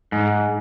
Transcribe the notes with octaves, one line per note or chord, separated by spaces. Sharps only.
G#2